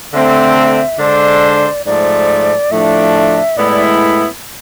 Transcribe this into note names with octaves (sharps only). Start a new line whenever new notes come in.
D3 A3 C4 E5
D3 G#3 D4 A4 C5 D5
G#2 F3 A3 D5
A2 F3 A3 D4 E5
A2 G#3 B3 E4 D5
D5